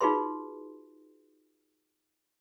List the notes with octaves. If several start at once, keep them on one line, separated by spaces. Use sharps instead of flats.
D#4 F4 F#4 G#4 B4 C6